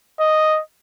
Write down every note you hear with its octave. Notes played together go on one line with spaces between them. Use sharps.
D#5